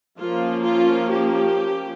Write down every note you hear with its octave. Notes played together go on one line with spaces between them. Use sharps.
F3 A#3 C#4 F4
F4
G4